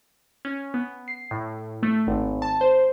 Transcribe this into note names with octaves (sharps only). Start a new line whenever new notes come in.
C#4
B3
C7
A2
A3
G#1
A5
C5